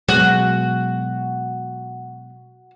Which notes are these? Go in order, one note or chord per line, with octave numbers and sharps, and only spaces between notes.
B2 F#3 G#3 F#4